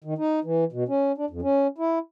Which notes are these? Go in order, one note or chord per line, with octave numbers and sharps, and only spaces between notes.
D#3
D#4
E3
B2
C#4
D4
F2
C#4
E4